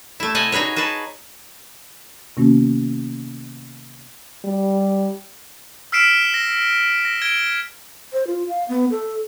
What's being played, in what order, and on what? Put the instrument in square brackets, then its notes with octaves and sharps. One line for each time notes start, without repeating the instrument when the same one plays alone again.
[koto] A3 E4
C3 A4 D#5 F#5 G#5
D#4 F#4 G#4 B4 C#5
F#4 G#4 B4 A5
[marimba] C3 D#3 A#3 B3 C#4 F#4
[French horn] G3
[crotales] E6 F6 B6 C7 D7 E7
A#6
A#6
G#6 D7 G7
[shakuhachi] C5
F4
F5
B3
A4